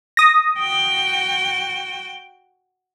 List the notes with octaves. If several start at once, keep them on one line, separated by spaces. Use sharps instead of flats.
D#6 A#6
F#4 G5